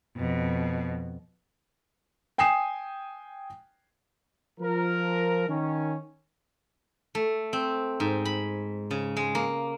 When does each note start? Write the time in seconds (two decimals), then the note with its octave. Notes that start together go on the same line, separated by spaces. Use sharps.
0.17 F2 B2
2.38 G5 G#5 D#6 C7 E7
4.60 F3 A#4
5.49 D#3 C#4
7.15 A3
7.53 C4
8.00 G#2
8.25 B5
8.91 C#3
9.17 G#3
9.35 A#3